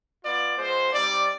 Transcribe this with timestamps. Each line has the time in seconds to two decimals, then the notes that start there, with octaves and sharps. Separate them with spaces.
0.23 B3 F4 D5
0.58 G#3 B3 F4 C5
0.93 G3 C4 D#4 D5